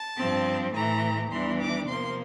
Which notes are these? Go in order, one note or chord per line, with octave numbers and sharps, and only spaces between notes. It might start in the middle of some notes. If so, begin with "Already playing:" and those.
Already playing: A5
G2 F3 C4
A2 E3 A3 A#5
E2 E3 G3 D4 C6
D6
C3 F3 A#3 C6